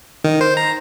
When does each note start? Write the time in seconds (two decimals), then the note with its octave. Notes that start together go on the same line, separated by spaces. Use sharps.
0.24 D#3
0.41 C5
0.57 A#5